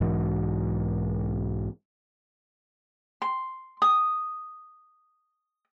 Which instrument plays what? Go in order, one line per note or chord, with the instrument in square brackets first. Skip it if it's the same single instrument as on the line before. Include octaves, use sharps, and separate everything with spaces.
[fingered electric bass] B1 G#2 E3
[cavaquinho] C6
D#6